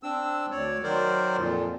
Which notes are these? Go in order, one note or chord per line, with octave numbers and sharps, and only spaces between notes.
C4 D4 E6
D2 C#5 D5
D#3 F#3 A#4 C5 D5
F2 A#2